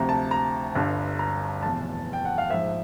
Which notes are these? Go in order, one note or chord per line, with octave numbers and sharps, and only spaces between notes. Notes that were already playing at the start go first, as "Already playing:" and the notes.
Already playing: D2 C3 F3 A#5
A5
A#5
G1 G2 D3
A#5
F1 E2 B2 A5
G5
F#5
F5
A#1 G#2 F3 E5